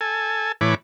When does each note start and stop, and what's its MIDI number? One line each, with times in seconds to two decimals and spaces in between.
0.01 0.52 69
0.01 0.52 80
0.61 0.75 45
0.61 0.75 52
0.61 0.75 73
0.61 0.75 83
0.61 0.75 86